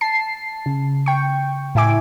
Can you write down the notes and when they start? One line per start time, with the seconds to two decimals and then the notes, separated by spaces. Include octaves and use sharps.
0.01 A5 C7
0.66 C#3
1.06 G5 C#6
1.75 A2 E4 E5 G#5 D6